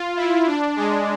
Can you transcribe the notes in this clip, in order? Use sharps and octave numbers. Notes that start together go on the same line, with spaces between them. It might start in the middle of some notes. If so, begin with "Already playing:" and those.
Already playing: F4
E4
D4
G#3